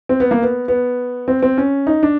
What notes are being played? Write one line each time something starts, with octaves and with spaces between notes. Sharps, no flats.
C4
B3
A#3
B3
B3
C4
C4
C#4
D#4
D4